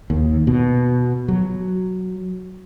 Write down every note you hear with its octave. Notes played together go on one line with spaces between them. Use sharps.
D#2
B2
F#3